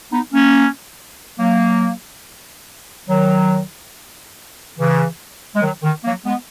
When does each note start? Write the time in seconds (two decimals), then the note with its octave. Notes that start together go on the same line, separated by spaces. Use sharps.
0.11 B3 D#4
0.32 A#3 C#4
1.38 F#3 A#3
3.08 D#3 F#3
4.78 C#3 E3
5.54 G#3
5.62 D#3 F#3
5.83 D#3
6.04 F#3 A#3
6.25 G#3 B3